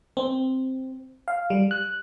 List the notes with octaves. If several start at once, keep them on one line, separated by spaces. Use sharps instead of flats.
C4
F5
G3
F#6